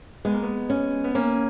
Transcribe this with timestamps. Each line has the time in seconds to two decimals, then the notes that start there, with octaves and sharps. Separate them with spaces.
0.25 G#3 B3
0.34 A#3
0.43 B3
0.70 C#4
1.04 B3
1.15 A#3 C#4